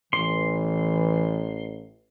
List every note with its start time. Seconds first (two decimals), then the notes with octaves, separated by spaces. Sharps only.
0.13 A1 E3 C6